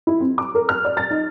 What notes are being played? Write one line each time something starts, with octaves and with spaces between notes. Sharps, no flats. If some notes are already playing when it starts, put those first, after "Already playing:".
E4
C4
D6
A#4
F6
D5
A6
D#4